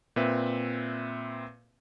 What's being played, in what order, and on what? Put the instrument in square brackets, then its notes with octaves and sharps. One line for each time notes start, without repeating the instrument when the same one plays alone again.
[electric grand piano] A#2 C4 B4 E5